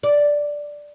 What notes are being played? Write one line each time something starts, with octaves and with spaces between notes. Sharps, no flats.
D5